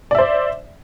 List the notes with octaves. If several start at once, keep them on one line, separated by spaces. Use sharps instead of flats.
C5 D5 E5